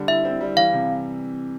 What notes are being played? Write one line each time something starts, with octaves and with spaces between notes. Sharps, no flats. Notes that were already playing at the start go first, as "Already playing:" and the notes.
Already playing: D3 G3
E4 E5
C4
G3
E3 F5
C3